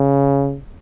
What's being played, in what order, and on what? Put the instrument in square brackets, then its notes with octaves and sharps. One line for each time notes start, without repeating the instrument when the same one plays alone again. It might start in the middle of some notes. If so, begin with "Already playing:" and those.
Already playing: [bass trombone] C#3